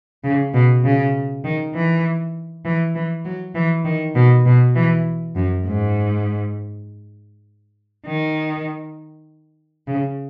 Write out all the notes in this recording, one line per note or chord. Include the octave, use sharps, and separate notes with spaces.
C#3
B2
C#3
D#3
E3
E3
E3
F#3
E3
D#3
B2
B2
E3
F#2
G#2
D#3
C#3